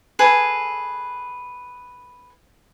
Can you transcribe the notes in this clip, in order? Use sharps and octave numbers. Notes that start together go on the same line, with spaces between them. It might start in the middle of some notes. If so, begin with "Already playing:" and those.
G#4 A4 B4